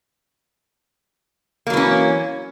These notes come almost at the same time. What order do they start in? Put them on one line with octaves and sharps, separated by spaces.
A#3 F#3 E3 C#4